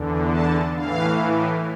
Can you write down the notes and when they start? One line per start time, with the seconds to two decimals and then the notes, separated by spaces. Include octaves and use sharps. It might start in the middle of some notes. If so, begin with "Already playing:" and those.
Already playing: E2 D3
0.31 A5
0.76 A2 E3 F5